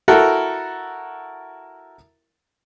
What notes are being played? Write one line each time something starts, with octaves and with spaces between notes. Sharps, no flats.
E4 F#4 A4 A#4